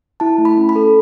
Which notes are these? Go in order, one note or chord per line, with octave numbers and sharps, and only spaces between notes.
E4 A5
A3
B5
C#4
B5
A4